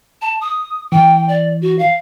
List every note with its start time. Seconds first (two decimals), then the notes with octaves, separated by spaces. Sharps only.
0.22 A5
0.41 D#6
0.92 E3 G5
1.29 D5
1.61 F#4
1.79 F5